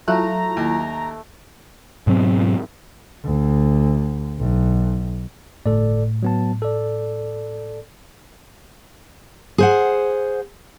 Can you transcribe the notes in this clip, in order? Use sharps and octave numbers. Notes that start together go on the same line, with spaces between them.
F#3 A3 E4 F4 A#5 F#6
D#2
G#2 B2 F#3 C4
D2
B1
G1 A2 A4 D5
F#3 B3 A5
A4 D5
G#4 C5 F#5